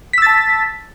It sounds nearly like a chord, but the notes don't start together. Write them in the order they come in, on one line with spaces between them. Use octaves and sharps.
B6 E6 A6 A5